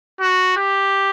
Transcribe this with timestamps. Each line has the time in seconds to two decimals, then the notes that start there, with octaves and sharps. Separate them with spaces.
0.21 F#4
0.57 G4